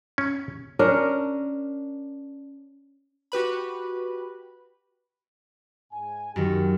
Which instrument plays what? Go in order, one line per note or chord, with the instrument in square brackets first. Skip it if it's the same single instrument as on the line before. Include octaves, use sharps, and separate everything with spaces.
[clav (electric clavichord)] C#4
[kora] C#4 D4 A#4
[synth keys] F#4 G4 B4 B5
[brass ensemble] G#2 G#5
[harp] F#2 D#3 [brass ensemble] G4